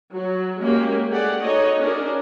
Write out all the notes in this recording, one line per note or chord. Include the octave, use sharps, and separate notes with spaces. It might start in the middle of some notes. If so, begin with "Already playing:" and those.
F#3
G#3 A#3 C#4 F#4 G4
A3 G4 G#4 D5 F#5
D#4 F#4 A4 C#5 D#5
C#4 D4 F#4 G#4 A#4